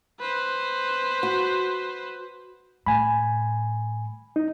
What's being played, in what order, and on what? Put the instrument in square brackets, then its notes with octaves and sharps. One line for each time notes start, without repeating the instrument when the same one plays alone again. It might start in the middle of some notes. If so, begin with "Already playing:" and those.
[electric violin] B4 C5
[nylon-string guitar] F#4
[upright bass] A2 [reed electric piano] G#5 B5
[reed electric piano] D#4